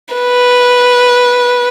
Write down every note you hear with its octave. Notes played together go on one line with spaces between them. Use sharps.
B4